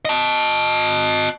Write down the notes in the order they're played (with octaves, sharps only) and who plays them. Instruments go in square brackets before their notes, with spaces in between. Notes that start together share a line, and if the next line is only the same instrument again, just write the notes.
[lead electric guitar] D#5 A5